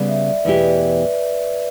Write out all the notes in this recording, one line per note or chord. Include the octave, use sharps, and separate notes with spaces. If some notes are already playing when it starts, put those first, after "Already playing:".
Already playing: C#3 G3 B3 D5
E5
D5
E2 B2 A3 E4 G4 B4
D5
B4